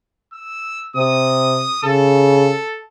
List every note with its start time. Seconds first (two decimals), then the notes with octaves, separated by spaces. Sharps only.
0.34 E6
0.96 C3 D#6
1.84 C#3 A4